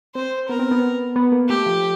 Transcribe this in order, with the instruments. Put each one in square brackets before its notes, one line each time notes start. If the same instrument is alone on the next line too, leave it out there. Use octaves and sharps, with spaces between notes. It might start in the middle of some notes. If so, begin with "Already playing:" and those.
[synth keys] C4 [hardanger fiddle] C5
[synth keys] B3 [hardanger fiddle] A#4
[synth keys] C4
B3
B3
A#3
[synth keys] A3 [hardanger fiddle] G4
[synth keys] F3